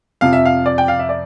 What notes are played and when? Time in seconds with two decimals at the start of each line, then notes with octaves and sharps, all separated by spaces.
0.21 F2 C3 F3 F5
0.33 E5
0.46 F5
0.66 D5
0.78 G5
0.88 F5
0.99 E5
1.09 D5